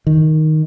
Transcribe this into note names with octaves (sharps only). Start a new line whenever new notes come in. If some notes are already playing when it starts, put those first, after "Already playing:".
D#3